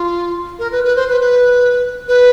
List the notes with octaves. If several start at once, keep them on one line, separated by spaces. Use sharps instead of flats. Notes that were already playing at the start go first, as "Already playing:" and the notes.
Already playing: F4
A#4
B4
B4
C5
B4
B4
B4